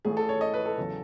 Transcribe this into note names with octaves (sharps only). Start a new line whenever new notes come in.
A1 A2 E3 A3 G#4
A4
C#5
D#5
B4
A4
E2 C#3 F#3